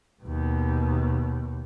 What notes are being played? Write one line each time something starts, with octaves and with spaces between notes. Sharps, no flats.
D#2 B2